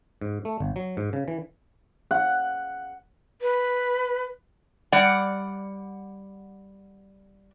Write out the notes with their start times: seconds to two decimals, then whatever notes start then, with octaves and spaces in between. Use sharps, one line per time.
0.21 G#2
0.45 A3
0.60 G1
0.76 F#3
0.97 G#2
1.13 C#3
1.28 E3
2.11 F#5
3.41 B4
4.92 G3 D5 F#5